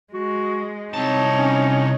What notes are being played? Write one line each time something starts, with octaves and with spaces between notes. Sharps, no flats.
G#3 F#4
C2 C4 D#4 C#5 A5
C#4